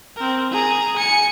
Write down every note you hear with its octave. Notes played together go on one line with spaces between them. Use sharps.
C4 A#4
G#4 A#5
G#5 C#7